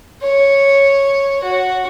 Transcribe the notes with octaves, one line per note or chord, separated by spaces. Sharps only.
C#5
F#4